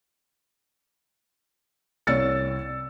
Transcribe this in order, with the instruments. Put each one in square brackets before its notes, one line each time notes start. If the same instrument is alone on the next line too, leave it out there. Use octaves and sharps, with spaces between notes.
[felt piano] C2 C#5 D5 E6 A6 C#7